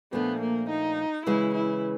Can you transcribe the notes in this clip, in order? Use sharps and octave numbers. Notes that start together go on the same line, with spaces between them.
A#2 F3 A3 B3 D4
A#3
D#4
C#3 E3 G#3 E4
E4